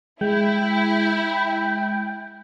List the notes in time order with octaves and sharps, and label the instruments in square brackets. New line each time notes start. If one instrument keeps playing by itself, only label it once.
[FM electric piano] G#3 [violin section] E4 [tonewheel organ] G5